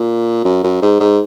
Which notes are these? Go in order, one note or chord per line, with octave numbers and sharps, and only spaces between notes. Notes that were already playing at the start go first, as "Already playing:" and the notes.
Already playing: A#2
F#2
F#2
G#2
G#2